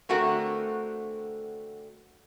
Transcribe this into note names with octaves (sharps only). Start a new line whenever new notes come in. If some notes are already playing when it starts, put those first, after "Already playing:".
D3 A3 C4 F#4 A#4